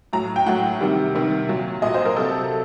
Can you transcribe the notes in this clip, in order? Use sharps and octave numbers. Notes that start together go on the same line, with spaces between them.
A2 F#3 A#5
G5
A2 F#3 F#5
C3 D#3 G3
C3 D#3 G3
A#2 F#3
A#2 F#3 D#5
C5
A#4
C3 F#3 A4